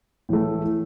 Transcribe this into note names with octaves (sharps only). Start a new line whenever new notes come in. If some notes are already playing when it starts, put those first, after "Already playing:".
A2 E3 A3